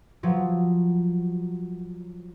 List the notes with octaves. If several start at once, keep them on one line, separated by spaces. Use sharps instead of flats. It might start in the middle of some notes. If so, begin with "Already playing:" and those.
F3 F#3